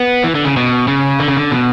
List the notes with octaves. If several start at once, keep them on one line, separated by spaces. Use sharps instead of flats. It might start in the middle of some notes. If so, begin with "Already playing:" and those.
Already playing: B3
E3
D3
C#3
B2
C#3
D3
C#3
D3
B2